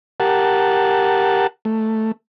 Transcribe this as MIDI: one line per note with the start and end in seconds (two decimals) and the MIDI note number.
0.20 1.47 67
0.20 1.47 70
0.20 1.47 78
0.20 1.47 81
1.65 2.12 57